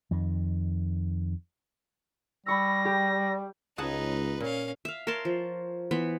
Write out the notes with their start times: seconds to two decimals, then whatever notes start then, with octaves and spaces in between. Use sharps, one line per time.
0.11 F2 D#3
2.46 G3 B5 C#6 E6 A#6
2.85 G4
3.78 C#2 D#4 G#4 B4 F#5 A5
4.40 A#2 C#4 F5
4.85 E5 F5
5.07 A#4 C#5 A5 C6
5.25 F3
5.91 E3 B3 C5 B5